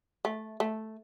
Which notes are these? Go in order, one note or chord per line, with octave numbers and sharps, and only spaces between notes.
A3
A3